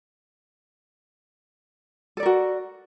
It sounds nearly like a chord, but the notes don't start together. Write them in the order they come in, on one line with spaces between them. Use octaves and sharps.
A4 D5 A#4 F#4